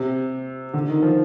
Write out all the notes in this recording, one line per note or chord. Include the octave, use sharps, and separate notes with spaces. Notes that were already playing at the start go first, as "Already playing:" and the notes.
Already playing: C3
D3
D#3
F3